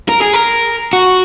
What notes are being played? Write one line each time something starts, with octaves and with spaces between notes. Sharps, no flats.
A#4
G#4
A#4
F#4